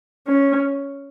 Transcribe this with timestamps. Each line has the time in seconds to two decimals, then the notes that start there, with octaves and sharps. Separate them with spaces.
0.28 C#4